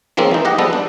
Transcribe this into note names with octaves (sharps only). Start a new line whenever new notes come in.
D#3 F3 G#3 A#3 C4 C#4
E3 D#4
G4 D#5 F#5
F3 G3 G#3 B3 A4
D4